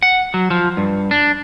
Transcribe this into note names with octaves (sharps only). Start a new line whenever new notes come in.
F#5
F#3
F3
G2
D4